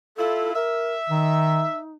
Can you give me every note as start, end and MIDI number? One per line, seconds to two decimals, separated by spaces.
0.17 0.54 64
0.17 0.54 65
0.17 0.53 69
0.55 0.94 70
0.55 1.78 76
1.10 1.64 51
1.10 1.93 63